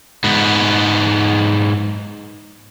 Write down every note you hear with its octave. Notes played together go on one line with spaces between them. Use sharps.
G#2 B3